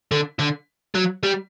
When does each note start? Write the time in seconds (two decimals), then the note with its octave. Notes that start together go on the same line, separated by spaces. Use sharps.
0.12 D3
0.40 D3
0.95 F#3
1.23 G3